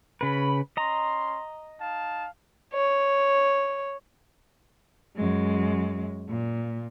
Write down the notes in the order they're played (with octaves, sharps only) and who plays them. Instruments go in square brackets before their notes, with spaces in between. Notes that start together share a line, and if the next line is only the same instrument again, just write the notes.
[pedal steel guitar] C#3 B4 [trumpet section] C#4 B5
[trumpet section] C#4 C6 [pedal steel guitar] D#5 A#5
[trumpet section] D#4 F5 A5
[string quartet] C#5
[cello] F#2 G#3
A#2